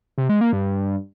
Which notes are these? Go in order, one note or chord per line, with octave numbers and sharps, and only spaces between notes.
C3
G#3
A#3
G2